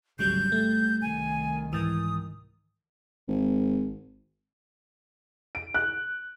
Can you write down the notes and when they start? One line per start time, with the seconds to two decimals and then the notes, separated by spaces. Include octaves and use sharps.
0.19 G#1 D2 C#3 F#3 G3 G6
0.52 G3 A3
1.02 C2 D#3 G#5
1.73 G#2 E3 D#6
3.28 G#1
5.55 D7
5.74 F#6